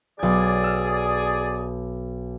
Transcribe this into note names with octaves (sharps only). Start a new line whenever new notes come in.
B1 G#4 D5 G#6
E6 F6